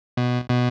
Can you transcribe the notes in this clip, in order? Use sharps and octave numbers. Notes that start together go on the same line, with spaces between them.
B2
B2